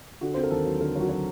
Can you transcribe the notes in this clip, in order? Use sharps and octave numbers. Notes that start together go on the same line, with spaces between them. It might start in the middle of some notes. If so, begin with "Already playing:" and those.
D3 F#4
C4 C5
A#4
D#2 A4
F#3
D3 A#4
F#3 F#4
F#3